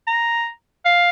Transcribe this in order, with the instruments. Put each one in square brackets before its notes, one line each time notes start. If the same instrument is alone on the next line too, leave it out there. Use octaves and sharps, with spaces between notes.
[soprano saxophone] A#5
F5